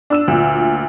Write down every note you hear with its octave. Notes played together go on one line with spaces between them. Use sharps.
D4 E6 E7
D2 A#2